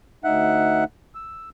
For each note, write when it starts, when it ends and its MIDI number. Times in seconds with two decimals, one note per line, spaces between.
0.24 0.84 38
0.24 0.84 63
0.24 0.84 76
0.24 0.84 78
0.24 0.84 90
1.15 1.49 88